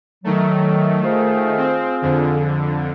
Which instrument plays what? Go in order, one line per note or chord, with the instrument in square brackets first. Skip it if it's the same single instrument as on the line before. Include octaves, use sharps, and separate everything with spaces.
[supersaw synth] D#3 A3 [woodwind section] F#3
[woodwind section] F4 G#4 C5
[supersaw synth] C4
F2 D3